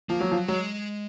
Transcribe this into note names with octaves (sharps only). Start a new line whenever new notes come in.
F3 A#3
F#3
F3
F#3
F#3 G#3